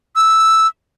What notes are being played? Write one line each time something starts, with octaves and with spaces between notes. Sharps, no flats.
E6